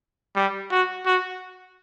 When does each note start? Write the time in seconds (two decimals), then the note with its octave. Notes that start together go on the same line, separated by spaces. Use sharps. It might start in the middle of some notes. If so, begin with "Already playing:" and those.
0.36 G3
0.71 F#4
1.06 F#4